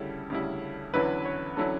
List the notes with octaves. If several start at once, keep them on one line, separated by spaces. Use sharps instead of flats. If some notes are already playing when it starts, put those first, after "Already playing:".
Already playing: D2 C#3 G3 C#4 E4 A4
D2 C#3 G3 C#4 E4
E2 D3 F#3 C#4 E4 B4
C#5
D3 F#3 C#4 E4 A4